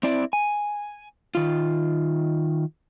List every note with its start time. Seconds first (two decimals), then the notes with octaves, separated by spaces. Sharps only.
0.03 C4 E4 D5
0.33 G#5
1.35 D#3 F4